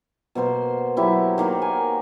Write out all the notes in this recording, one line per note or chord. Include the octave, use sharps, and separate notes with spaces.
B2 A#3 C5 C6
F#3 E4 G4
D#3 A#3 A#4
G#5